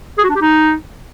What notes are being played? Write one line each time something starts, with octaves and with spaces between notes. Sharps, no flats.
G#4
F#4
D4
G4
D#4